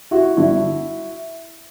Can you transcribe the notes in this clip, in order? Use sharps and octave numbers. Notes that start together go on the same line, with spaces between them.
E4 F#4
G1 G2 D3 E4 F#4